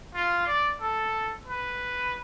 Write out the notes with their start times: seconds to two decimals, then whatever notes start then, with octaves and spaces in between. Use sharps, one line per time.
0.15 F4
0.47 D5
0.81 A4
1.47 B4